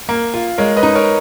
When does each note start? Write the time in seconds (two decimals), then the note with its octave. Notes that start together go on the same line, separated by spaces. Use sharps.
0.09 A#3
0.34 F4
0.58 G#3 A#4 C#5
0.76 B4 D#5
0.83 D#4
0.95 A#4 C#5